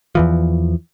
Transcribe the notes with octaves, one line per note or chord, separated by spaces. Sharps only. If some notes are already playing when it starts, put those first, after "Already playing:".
E2 E3 F3